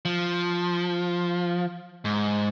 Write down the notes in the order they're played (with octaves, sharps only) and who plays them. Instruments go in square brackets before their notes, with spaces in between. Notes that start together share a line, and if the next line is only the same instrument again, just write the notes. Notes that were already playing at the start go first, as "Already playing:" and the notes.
[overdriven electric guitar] F3
G#2